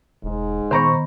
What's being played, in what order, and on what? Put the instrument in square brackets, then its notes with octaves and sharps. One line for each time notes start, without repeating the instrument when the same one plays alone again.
[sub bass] E1 [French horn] G#2
[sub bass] A#2 [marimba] D#3 B3 A#6 [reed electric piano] C5 A#5 C#6